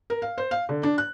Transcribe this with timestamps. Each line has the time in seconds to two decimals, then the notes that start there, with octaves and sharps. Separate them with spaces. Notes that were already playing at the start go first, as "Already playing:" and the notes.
0.10 A#4
0.22 F5
0.38 C5
0.51 F5
0.69 D3
0.83 D4
0.98 F#6